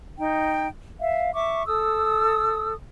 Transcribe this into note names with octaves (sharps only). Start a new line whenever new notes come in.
D#4 G5
E5 F5
E5 C#6 D6
A4 D#6 E6